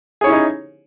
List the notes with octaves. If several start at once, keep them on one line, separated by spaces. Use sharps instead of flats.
C#4 D#4 E4 G#4 C#5